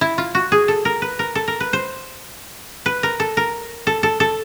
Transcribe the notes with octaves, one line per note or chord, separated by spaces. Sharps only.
E4
F4
F#4
G#4
A4
A#4
B4
A#4
A4
A#4
B4
C5
B4
A#4
A4
A#4
A4
A4
A4